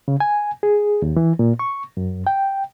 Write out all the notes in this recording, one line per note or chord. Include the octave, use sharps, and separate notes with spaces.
C#3
G#5
G#4
D#2
E3
A#2
C#6
F#2
G5